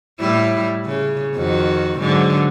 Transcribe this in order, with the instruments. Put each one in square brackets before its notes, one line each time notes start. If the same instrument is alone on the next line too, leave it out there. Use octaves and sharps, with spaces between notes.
[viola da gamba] A2 G3 E4
C#3
F2 D#3 F#4
G#2 D3 F#3